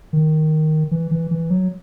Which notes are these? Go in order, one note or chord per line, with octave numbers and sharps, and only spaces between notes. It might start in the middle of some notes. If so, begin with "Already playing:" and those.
D#3
E3
E3
E3
F#3